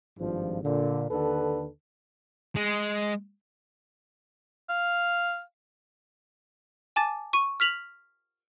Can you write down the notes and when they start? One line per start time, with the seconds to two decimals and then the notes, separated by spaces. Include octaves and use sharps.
0.19 G#1 G2 F3
0.62 A#2 D3
1.10 D#2 D3 A4 B4
2.56 G#3
4.69 F5
6.96 G#5 A5 D6 A6
7.33 C#6 D#7
7.60 F6 B6 F7 F#7